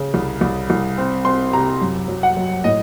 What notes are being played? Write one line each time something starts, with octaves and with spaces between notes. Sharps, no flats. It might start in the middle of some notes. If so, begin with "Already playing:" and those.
Already playing: C#3
C2
C2
C2
C4
C4 C6
C3 A#5
F#2
F#3
F#5
F#3
A2 D#5